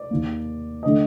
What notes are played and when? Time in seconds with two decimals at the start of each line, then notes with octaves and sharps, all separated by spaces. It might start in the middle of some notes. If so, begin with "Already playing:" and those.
Already playing: D5
0.11 D#2 D#3 A#3
0.83 D3 A3 D#5